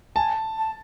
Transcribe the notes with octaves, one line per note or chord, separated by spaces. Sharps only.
G#5 A5
A5